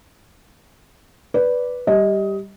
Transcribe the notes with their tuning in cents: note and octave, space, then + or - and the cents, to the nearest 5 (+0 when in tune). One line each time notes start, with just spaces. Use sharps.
B4 +0 D5 -10
G3 +0 D#5 +20